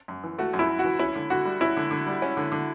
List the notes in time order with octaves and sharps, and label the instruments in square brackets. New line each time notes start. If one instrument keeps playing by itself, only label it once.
[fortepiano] F#2
E3
[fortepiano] A3 [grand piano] F#4
[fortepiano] F#2
[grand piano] E4
[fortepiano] F#2
[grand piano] F#4
[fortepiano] E3
[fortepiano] C#4 [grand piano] E4
[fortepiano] D3
[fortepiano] D3 [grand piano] F#4
[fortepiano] G3
[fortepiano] C#4 [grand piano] E4
[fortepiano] D3
D3
G3
C#4
D3
D3